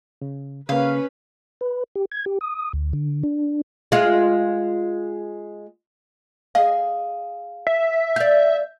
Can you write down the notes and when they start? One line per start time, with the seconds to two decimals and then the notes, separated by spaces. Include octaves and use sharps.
0.22 C#3
0.69 C#3 A#3 C#4 B4 F5
1.61 B4
1.96 G4
2.12 G#6
2.26 G4
2.41 D#6
2.73 D2
2.93 D3
3.23 D4
3.92 G#3 F4
6.55 G#4 D#5 F5
7.67 E5
8.16 D5 F5 G6